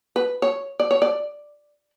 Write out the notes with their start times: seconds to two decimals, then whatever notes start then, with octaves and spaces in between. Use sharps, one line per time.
0.16 B4
0.42 C#5
0.80 D5
0.91 C#5
1.02 D5